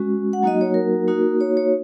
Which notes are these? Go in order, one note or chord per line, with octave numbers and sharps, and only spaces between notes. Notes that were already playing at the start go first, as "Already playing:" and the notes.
Already playing: G#3 C#4 F#4
F#5
F#3 A#3 D#4 F#4 D#5
C#5
A#4
A#3 D#4 F#4
C#5
C#5